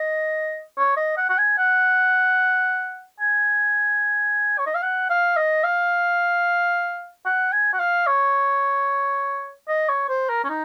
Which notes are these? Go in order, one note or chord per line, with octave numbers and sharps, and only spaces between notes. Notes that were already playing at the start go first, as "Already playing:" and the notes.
Already playing: D#5
C#5
D#5
F#5
F#5
G#5
F#5
G#5
C#5
D#5
F5
F#5
F5
D#5
F5
F#5
G#5
F#5
F5
C#5
D#5
C#5
C5
A#4
C#4
D#4